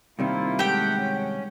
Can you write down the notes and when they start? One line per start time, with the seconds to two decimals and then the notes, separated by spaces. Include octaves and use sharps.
0.19 G2 C3 D#3 A#3 E4 F4
0.59 G#3 A3 G4 F#5 G5
0.97 C#4